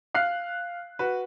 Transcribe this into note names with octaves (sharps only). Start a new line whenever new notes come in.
F5 F#6 C7
F#4 B4